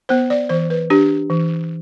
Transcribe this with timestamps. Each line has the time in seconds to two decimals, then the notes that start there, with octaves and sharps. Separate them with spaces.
0.09 B3 C5
0.30 D5
0.49 E3 C5
0.70 B4
0.90 D4 G4
1.30 E3